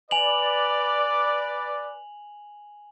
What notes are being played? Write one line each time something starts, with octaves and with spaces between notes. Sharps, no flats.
B4 D5 G#5 F7 F#7